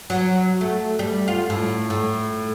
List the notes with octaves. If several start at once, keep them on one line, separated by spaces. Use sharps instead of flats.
F#3
A3
G3
F4
A2
A2